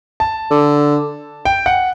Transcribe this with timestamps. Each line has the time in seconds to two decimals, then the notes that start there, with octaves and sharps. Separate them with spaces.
0.20 A5
0.51 D3
1.45 G5
1.66 F#5